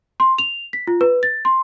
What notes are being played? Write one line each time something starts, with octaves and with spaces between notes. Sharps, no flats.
C6
F7
B6
F4
B4
A6
C6